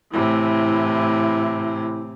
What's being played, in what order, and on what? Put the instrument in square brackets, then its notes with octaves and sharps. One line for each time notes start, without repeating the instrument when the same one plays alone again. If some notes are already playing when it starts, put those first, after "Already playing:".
[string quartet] A2 C3 E3 [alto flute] E4